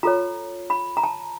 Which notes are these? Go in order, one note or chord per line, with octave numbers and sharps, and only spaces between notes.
F4 A4 C#5 A#5
B5
A#5
A5